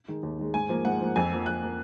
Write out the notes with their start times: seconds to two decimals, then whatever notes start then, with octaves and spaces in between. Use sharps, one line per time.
0.08 D#3 G#3
0.23 D#2
0.39 D#3 G#3
0.54 G#2 G#5
0.69 F3 A#3
0.85 G#2 F#5
1.01 F3 A#3
1.16 F2 G#5
1.31 F3 A#3
1.46 F2 F#6
1.62 F3 A#3